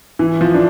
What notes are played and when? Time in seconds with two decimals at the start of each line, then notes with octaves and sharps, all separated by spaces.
0.19 E3
0.41 F3
0.54 D4